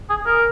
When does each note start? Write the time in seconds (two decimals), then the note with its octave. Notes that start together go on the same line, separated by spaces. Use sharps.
0.09 G#4
0.26 A#4